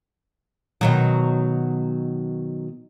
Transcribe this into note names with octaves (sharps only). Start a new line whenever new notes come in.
B2 D#3 F#3